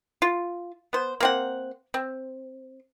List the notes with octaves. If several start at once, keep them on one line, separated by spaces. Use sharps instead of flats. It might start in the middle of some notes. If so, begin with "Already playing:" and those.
F4
B3 C5
A#3 C4 F#5
C4